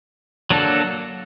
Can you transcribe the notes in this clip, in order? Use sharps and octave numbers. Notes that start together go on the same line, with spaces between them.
F#3 A#3 D4 F#4 A4